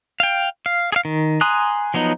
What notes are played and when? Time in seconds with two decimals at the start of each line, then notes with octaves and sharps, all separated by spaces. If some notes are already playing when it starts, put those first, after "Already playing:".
0.20 F5 G5
0.66 F5
0.92 G#4 F5
1.05 D#3
1.41 G#5 A#5 C6 D#6 F#6
1.94 F3 F#3 B3 D#4